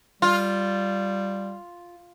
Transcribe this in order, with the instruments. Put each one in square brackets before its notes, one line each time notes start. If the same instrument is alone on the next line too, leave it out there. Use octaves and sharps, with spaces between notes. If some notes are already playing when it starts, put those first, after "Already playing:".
[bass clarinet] G3 [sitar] F4